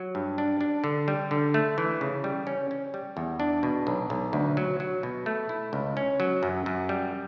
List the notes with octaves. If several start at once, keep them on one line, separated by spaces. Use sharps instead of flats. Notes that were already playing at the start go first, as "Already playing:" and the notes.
Already playing: F#3
G2
D4
D4
D3
G3
D3
A3
E3
C#3
G3
C#4
C#4
G3
E2
D4
B2
B1
B1
D2
F#3
F#3
B2
A3
E4
C#2
C#4
F#3
F#2
F#2
G3